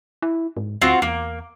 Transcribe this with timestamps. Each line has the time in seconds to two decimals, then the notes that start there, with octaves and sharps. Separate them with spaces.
0.22 E4
0.57 G#2
0.82 D2 C4 F4 F#4
1.02 E2 A#3